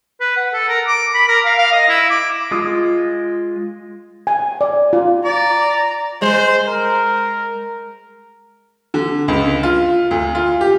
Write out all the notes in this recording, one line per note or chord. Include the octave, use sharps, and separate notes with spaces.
B4
F#5
A4
A#4
D6
B5
A#4
F5
F5
D#5
E4
D6
G#3 F4 D#6
G#5
D5
F4
D5 A#5
G#3 C5
A#4
D3
C#2
F4
D2
F4
G4